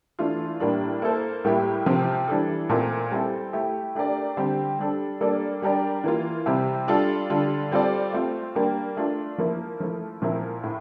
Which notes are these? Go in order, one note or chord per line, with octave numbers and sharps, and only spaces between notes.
E3 A3 D4 F4
A2 G3 A#3 D4
A#3 E4 A4 C5
A2 G3 A#3 E4 G4
C3 F3 C4 G4
E3 G3 D4 A4
A#2 A3 C4 F4 A#4
G3 C4 E4 A4
A3 E4 G4
A3 D4 G4 A#4 D5
D3 G3 C4 G4 C5
G3 D4 A4
G3 A#3 D4 A4 D5
G3 D4 G4 A#4 D5
E3 A#3 F4
C3 G3 C4 E4 G4
G3 D4 F4 A4
D3 G3 D4 F4 A4
G3 C4 F4 A4 D5
A3 C4 F4
G3 A#3 D4 G4
A3 D4 F4
F3 A#3 E4
F3 A3 E4
A#2 F3 C4 E4 A#4
A2